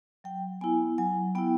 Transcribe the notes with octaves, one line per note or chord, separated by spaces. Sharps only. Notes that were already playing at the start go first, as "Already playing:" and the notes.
F#3 G5
B3 E4 G#5
F#3 G#5
B3 E4 G5